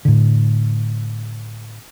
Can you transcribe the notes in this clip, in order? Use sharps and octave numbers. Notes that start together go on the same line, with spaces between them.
A2 D3